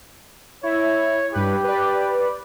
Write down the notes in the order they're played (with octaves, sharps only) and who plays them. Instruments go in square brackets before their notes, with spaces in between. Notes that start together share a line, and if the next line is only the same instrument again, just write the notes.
[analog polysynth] E4 [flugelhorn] C#5
[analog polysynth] G2 B4 [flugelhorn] G4
[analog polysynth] B4 D5